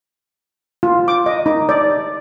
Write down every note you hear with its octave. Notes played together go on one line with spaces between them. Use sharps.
F4
D6
D#5
D#4
D5